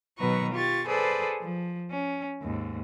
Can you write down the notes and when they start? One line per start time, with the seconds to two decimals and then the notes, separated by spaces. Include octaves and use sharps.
0.18 B2 D#3 F#3 B4 A#5 C#6
0.53 F4 G4 C#6 A6
0.87 G#4 A4 B4 C5 D5
1.41 F3
1.91 C#4
2.42 D#2 G#2